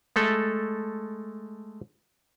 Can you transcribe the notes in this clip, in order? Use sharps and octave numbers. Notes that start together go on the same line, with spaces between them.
G#3 A3 A4